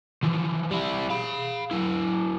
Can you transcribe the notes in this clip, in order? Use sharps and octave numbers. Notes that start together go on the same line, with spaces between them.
E3 F3
G3 E4
F5 B5
F#3 E4